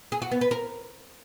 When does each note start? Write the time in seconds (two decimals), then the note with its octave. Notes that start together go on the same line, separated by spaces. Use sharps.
0.12 G#4
0.22 F#4
0.31 B3
0.41 B4
0.51 A#4